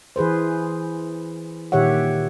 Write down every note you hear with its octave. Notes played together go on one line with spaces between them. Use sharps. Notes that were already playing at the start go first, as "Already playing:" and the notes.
E3 G#4 B4 C5
A#2 D#3 G4 C#5 E5 F#5